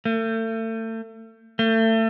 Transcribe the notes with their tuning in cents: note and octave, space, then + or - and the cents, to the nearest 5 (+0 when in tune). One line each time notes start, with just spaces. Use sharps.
A3 +35
A3 +30